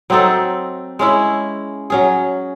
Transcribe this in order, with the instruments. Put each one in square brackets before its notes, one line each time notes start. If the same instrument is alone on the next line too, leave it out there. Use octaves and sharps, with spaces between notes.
[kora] F#3 C4 D#4 A4
G#3 C#4 E4
F#3 C#4 G#4